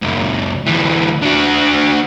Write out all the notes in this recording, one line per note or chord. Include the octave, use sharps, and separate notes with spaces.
C#2 F#2
D2 E3
D3 F#4